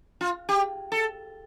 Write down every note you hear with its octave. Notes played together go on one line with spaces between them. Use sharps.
F4
G4
A4